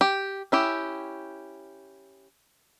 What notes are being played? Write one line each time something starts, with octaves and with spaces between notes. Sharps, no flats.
G4
C#4 E4 G4